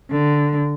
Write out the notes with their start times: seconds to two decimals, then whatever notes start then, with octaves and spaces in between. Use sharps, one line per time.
0.11 D3